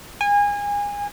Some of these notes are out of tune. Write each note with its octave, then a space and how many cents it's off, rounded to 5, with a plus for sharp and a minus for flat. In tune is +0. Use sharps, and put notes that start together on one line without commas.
G#5 -25